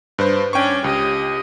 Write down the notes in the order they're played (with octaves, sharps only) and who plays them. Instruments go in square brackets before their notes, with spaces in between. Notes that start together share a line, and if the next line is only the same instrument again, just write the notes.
[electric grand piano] G2 B4 C5
[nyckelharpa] C#4 D4 [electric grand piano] G5 C#6
[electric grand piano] C#2 [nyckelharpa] G4 D#5